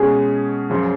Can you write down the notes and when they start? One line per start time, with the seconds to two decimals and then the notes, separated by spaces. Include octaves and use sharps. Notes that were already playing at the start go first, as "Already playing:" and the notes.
Already playing: B2 G#3 C#4 G#4
0.70 F#2 C#3 F3